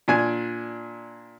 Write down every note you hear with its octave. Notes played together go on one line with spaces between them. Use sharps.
A#2 D4 G#5